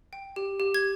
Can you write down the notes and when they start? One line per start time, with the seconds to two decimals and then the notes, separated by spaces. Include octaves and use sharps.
0.13 G5
0.36 G4
0.60 G4
0.74 G#6